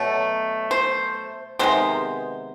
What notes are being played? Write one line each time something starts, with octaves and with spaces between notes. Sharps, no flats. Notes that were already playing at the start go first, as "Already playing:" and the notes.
Already playing: B2 F#3 A3 C#5
C5
C3 D#3 G#3 B3 C5